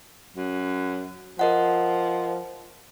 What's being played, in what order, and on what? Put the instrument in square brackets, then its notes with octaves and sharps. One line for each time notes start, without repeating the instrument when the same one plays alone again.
[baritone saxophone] F#2
[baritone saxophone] F3 [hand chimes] A#4 D#5 F#5